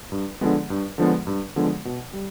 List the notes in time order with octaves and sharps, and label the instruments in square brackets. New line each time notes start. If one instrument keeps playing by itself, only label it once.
[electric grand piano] G2
D3 F3 G#3 B3
G2
D3 F3 G#3 B3
G2
D3 F3 G#3 B3
B2
G3